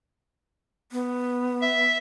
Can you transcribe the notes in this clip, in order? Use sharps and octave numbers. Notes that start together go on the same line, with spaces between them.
B3
E5